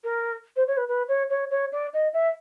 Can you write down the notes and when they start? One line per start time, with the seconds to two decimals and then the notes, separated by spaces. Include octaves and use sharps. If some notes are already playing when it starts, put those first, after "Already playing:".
0.04 A#4
0.56 C5
0.68 C#5
0.77 B4
0.88 B4
1.08 C#5
1.30 C#5
1.51 C#5
1.72 D5
1.94 D#5
2.13 E5